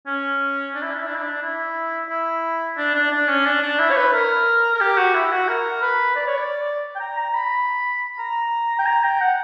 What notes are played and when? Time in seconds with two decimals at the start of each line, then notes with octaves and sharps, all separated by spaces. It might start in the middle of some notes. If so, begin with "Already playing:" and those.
0.07 C#4
0.75 D4
0.82 E4
0.91 D4
0.99 E4
1.07 D4
1.15 E4
1.22 D4
1.42 E4
2.09 E4
2.77 D4
2.95 D4
3.11 D4
3.28 C#4
3.45 D4
3.62 D4
3.79 E4
3.91 C#5
3.96 B4
4.13 A#4
4.74 A#4
4.81 G4
4.97 F#4
5.14 E4
5.32 F#4
5.48 A#4
5.82 B4
6.16 D5
6.27 C#5
6.37 D5
6.95 G5
7.00 A#5
7.17 A#5
7.34 B5
8.19 A#5
8.79 G5
8.86 A#5
9.04 G5
9.21 F#5